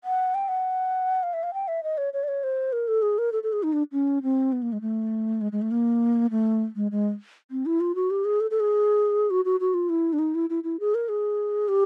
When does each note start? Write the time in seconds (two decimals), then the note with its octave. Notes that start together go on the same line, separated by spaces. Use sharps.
0.04 F#5
0.35 G5
0.48 F#5
1.23 F5
1.33 E5
1.43 F5
1.54 G5
1.68 E5
1.83 D#5
1.98 C#5
2.13 C#5
2.24 D5
2.28 C#5
2.43 C5
2.73 A#4
2.88 A4
3.02 G#4
3.18 A#4
3.32 A4
3.43 A4
3.53 G#4
3.63 D#4
3.73 D4
3.92 C#4
4.23 C4
4.52 B3
4.62 A#3
4.73 G#3
4.81 A3
5.41 G#3
5.52 G#3
5.62 A3
5.71 A#3
6.31 A3
6.76 G#3
6.91 G#3
7.51 C4
7.66 E4
7.80 F4
7.95 F#4
8.10 G4
8.25 G#4
8.40 A4
8.51 A4
8.60 G#4
9.30 F#4
9.45 F#4
9.60 F#4
9.74 F4
9.89 E4
10.13 D4
10.19 D#4
10.35 E4
10.50 E4
10.64 E4
10.80 G#4
10.94 A#4
11.09 G#4
11.68 G4